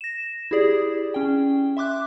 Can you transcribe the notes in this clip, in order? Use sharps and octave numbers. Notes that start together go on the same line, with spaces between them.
A#6 E7
E4 G4 G#4 D5
C#4 G5
E5 C6 D6 F#6